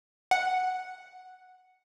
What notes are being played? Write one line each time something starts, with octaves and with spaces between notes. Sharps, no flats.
F#5